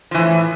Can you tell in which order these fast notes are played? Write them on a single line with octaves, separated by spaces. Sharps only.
F3 E3 A2